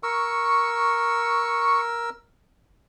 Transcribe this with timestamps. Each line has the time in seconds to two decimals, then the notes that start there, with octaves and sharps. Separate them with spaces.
0.03 A#4 C#6 E6